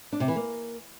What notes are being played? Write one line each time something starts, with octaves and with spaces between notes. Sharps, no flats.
D4
C3
E3
A#3